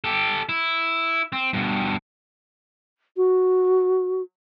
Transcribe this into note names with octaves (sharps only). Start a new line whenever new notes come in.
G4 A4
E4
C4
G2 B2
F#4